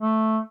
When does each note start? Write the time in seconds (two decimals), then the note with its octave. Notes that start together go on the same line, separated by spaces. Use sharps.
0.01 A3